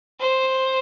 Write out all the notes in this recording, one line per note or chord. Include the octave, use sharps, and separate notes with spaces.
C5